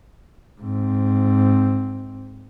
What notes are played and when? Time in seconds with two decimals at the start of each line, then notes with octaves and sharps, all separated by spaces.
0.61 G#2 C4